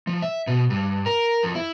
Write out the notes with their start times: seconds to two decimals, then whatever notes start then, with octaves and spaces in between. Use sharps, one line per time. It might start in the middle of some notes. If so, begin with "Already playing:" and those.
0.07 F3
0.22 E5
0.47 B2
0.70 G2
1.06 A#4
1.43 F2
1.55 E4